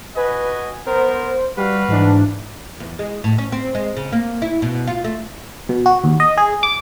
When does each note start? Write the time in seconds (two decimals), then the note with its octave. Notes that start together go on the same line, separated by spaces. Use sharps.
0.17 F#4 B4 D#5 G#5
0.87 B3 A#4 C5
1.57 G3 F#4 B4 F5
1.88 G#2 E3 D4
2.80 E2
2.99 G#3
3.24 A2
3.38 C#4
3.52 C4
3.75 G#3
3.97 C#3
4.12 A#3
4.42 E4
4.62 B2
4.87 F4
5.04 A3
5.69 B2
5.86 F#4
6.04 D#2
6.20 D#5
6.37 G#4
6.63 D6